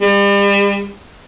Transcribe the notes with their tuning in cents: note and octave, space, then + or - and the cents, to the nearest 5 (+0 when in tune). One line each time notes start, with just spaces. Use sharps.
G3 +40